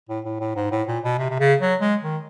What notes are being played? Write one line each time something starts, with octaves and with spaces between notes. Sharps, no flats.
A2
A2
A2
G#2
A2
A#2
B2
C3
C3
C#3
F#3
G#3
D#3